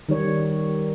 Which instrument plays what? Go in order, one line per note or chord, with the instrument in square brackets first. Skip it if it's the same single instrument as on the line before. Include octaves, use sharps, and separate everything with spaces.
[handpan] D#3 G3 C#5